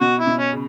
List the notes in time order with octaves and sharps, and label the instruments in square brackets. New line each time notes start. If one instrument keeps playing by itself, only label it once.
[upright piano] B2 [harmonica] F#4
[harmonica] E4
[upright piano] B2
[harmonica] C#4
[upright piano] C#3